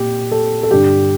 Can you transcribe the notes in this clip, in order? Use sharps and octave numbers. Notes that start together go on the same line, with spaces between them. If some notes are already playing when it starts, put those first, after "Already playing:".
Already playing: A#2 G4
A4
A4
G2 D3 G4